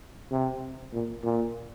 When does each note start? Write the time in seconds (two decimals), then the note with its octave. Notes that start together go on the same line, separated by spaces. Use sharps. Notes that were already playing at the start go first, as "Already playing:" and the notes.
0.32 C3
0.93 A#2
1.24 A#2